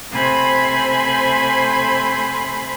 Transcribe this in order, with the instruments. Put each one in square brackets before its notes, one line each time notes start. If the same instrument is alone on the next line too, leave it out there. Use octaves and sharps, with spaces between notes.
[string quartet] C3 A3 C5 G#5 B5 C6